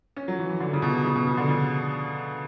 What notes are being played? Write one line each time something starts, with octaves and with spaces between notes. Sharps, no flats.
C#4
F#3
E3
E3
D3
C#3
B2
C#3
B2
C#3
D3
C#3